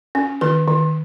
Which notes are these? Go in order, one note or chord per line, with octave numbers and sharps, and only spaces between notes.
C#4
D#3 B4
D#3